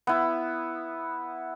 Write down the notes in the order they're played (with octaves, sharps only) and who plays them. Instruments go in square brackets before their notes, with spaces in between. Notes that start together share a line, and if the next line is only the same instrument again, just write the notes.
[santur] B3 E4